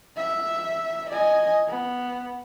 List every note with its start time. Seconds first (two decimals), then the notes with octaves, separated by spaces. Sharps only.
0.17 E5
1.10 D#5 G#5
1.68 B3